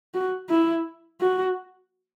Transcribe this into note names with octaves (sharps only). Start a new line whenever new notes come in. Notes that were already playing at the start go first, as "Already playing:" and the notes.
F#4
E4
F#4